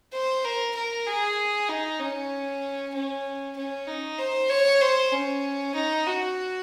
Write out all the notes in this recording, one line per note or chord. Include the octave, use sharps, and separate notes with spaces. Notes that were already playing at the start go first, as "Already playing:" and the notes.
C5
A#4
A#4
G#4
D#4
C#4
C#4
C#4
D#4
C5
C#5
C5
C#4
D#4
F#4